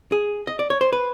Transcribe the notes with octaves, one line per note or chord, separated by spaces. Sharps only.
G#4
D#5
D5
C#5
C5
B4